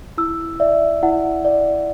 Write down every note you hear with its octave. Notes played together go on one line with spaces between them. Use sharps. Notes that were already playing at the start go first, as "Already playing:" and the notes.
E4 E6
D5 E5
E4 F#5
D5